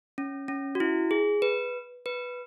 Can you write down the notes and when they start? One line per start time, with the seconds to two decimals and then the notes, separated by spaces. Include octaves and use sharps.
0.18 C#4
0.48 C#4
0.75 F#4
0.80 E4
1.11 G#4
1.42 B4
2.06 B4